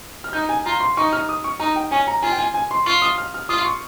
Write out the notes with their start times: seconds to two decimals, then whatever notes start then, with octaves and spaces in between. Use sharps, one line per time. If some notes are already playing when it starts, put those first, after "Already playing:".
0.24 F6
0.33 D#4 G6
0.49 G#5
0.66 F4 A#5
0.80 C6
0.97 D#4 C#6
1.13 F6
1.29 D#6
1.44 C#6
1.60 D#4 A#5
1.76 G5
1.91 C#4 G#5
2.07 A#5
2.23 F4 G#5
2.32 G5
2.38 G#5
2.54 G#5
2.71 C6
2.86 F4 C#6
3.02 D#6
3.18 F6
3.34 F6
3.49 F4 D#6
3.61 C6
3.65 C#6